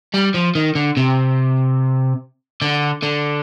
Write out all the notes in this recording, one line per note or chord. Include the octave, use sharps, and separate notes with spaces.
G3
F3
D#3
D3
C3
D3
D3